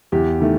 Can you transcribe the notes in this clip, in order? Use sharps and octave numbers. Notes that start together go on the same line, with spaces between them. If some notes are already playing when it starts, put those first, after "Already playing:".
E2 G4
D#3 A3